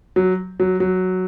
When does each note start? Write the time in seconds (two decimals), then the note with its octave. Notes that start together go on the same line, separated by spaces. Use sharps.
0.16 F#3
0.60 F#3
0.80 F#3